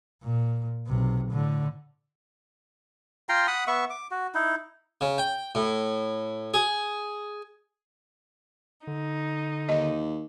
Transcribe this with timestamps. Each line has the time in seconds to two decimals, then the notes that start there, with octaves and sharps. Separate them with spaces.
0.23 A#2
0.87 B1 C3
1.31 A2 D3
3.29 F4 G5 A#5 C6
3.47 F#5 B5 D#6
3.67 B3 E5 C#6
3.90 D6
4.11 F#4
4.34 D#4 E4
5.01 C#3
5.18 G5
5.55 A2
6.54 G#4
8.87 D3 D#4
9.69 D#2 D#5